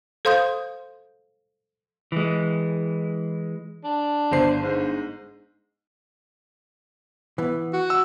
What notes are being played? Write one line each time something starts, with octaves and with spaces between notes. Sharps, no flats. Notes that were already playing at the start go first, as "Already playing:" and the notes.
A4 C5 F5 C6 D#6 G6
E3 G#3
D4
G1 C5 C7
G#2
E3 B3
F#4
E6